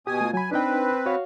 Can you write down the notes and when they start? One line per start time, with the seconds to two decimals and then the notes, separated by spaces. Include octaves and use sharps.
0.07 B2 G4 G#5 D#6
0.21 A3 F4
0.34 F#3 G#5 B5
0.51 C4 D4 D#4 B4 G5
1.06 F#4 C#5 F5